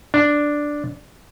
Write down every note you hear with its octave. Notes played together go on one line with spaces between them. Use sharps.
D4